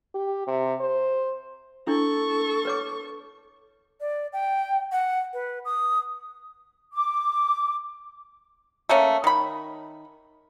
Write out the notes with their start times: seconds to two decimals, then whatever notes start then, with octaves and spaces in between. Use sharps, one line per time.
0.14 G4
0.47 C3
0.81 C5
1.87 D4 E4 A4 C#6
2.65 B4 C#5 D6
4.00 D5
4.33 G5
4.92 F#5
5.33 B4
5.65 D#6
6.93 D6
8.89 A3 A#3 C#4
9.24 D#3 B5